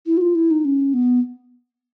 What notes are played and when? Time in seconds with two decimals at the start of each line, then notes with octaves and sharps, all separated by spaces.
0.07 E4
0.17 F#4
0.21 F4
0.35 E4
0.51 D#4
0.65 C#4
0.94 B3